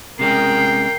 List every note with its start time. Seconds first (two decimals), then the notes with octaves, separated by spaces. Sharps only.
0.19 C3 G#3 C#4 A#4 G5 C7